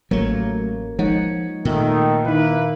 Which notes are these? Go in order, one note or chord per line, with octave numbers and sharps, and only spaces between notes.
A1 F#3 A3 A#3 A#4 C#5
F3 G#3 D#4 C#5 F#5
A#2 D#3 A3
D#3 A#3 D#4 E4 B4